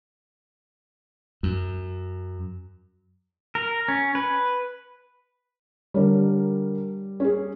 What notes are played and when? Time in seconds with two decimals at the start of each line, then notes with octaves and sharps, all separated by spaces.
1.43 F#2
3.55 A#4
3.88 C#4
4.15 B4
5.94 D3 G3 A#4 C#5
7.20 C#4 G#4